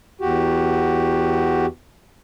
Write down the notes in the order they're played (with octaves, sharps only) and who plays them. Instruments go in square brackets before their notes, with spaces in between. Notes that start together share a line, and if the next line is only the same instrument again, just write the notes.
[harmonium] E2 F#4 G4